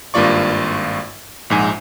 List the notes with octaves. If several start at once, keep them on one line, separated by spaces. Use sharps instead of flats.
G#1 G2 A#3 F4 D5 C#6
A#1 G#2 G#5